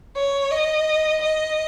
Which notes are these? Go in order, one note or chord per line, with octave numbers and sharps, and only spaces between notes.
C#5
D#5
D#5